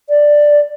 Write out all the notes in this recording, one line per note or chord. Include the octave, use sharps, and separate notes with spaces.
D5